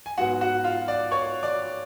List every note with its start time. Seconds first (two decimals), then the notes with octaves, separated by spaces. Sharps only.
0.06 G#5
0.18 G#2 F#3 B3 F#4 F#5
0.41 F#4 F#5
0.64 F4 F5
0.88 D5
1.11 C#5 C#6
1.43 D5 D6